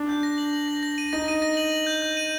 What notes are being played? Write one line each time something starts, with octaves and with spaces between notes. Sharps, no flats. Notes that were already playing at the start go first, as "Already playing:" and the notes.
Already playing: D4
G6
A#6
F#7
F#7
A#6
A#6
D#7
D#4 A#6
D#7
A#6
F#7
F#7
G6
G6
D#7